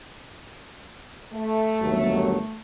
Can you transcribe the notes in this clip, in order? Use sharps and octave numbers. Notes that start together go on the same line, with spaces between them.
A3
G1 D#2 F#3